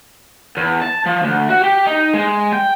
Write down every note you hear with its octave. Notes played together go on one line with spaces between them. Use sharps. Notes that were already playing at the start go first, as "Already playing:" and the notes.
E2
A5
F3
D2
F#4
G4
D#4
G#3
G5